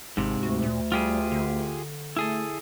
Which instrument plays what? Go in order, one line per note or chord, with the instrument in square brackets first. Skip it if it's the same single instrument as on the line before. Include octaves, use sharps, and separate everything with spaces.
[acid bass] G#1 [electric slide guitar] G#2 C3
[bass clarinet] D2 [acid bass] F#4
[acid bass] A#2
[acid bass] G3 [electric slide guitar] F4 G4 G#4
[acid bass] D3
[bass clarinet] A3 [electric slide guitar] E4 G#4 A4